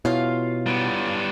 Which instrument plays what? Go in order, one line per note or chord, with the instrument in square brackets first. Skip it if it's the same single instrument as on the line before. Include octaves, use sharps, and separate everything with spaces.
[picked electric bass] B2 [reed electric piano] E4 C#5 [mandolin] F4 F5
[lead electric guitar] G3 B3